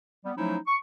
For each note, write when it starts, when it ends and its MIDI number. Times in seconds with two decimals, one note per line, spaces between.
0.24 0.32 55
0.24 0.32 59
0.36 0.57 53
0.36 0.57 54
0.36 0.57 57
0.36 0.57 61
0.36 0.57 63
0.36 0.57 64
0.67 0.76 85